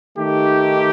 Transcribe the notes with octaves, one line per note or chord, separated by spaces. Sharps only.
D#3 A3 D#4 G4